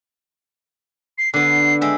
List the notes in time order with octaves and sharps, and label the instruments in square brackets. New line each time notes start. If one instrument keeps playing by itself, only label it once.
[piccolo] C7
[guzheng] D3 B3 [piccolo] C7
[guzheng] G#3 E5 G5